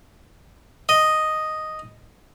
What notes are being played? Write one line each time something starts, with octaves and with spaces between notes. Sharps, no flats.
D#5